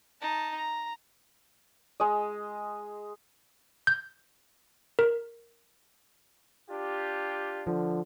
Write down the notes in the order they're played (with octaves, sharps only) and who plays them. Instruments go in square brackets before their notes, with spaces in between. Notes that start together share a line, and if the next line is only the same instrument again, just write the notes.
[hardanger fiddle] D#4 A5
A#5
[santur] G#3 D#5
[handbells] G6
A#4
[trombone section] D4 F4 G4
[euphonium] D3 [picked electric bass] F3